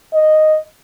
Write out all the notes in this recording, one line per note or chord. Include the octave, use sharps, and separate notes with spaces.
D#5